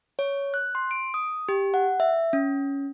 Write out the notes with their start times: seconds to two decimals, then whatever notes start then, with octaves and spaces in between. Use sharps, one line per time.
0.19 C#5
0.54 F#6
0.75 C6
0.91 D7
1.14 D#6
1.49 G4
1.74 F#5
2.00 E5
2.33 C#4